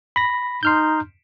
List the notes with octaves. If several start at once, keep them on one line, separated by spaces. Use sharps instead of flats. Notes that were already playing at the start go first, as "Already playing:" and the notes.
B5 A#6
D#4 C6 F6 G6